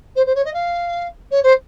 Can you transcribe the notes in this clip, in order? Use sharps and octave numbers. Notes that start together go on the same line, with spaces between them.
C5
C5
C#5
D#5
F5
C#5
C5